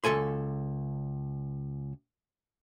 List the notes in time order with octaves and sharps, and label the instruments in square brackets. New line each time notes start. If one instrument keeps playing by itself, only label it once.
[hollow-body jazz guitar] C#2 A#2 A4 G#5 C6